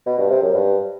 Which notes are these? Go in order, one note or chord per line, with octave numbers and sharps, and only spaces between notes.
B2
G2
C3
F#2
G2